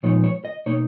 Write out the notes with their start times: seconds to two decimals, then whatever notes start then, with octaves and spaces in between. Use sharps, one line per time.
0.03 A#2 F3 G#3 B3 D#4 C#5
0.24 C#5
0.45 D#5
0.66 B2 A#3 D#4 C#5